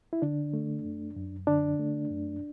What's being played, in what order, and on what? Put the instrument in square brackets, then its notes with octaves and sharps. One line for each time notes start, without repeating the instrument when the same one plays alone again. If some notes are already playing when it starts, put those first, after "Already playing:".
[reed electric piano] E4
D3 D4
A3
F#2
F#2
D3 D4
A3
F#2